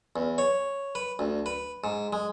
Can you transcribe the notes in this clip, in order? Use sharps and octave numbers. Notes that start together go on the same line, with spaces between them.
E2
C#5
B4
D2
B4
G#2
G#3